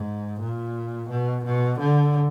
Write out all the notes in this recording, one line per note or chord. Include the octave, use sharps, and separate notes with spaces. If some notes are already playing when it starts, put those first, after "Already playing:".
Already playing: G#2
A#2
B2
B2
D3